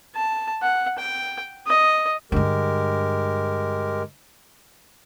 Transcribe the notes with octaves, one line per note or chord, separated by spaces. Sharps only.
A5
F#5
G5
D#5
G2 D3 G#3 G4 A#4